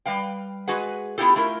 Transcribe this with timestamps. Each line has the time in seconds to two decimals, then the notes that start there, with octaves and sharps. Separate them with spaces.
0.06 G3 B4 F5 G5
0.68 G#3 F#4 G#4 B4 F#5
1.18 B3 E4 F4 G4 A4
1.36 A3 E4 F4 A#4